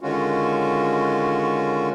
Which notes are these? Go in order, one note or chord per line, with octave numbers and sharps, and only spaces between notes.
D3 D#3 G#3 C#4 F4 F#4